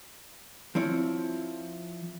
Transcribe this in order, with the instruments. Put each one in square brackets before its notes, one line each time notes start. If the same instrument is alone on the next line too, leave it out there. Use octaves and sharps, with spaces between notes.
[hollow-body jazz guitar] F3 C4 E4 C#5